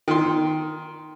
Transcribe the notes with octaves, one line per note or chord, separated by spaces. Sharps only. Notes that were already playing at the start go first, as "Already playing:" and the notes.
D#3 C6